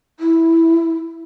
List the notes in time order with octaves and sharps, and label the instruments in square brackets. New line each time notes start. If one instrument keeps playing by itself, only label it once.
[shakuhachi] E4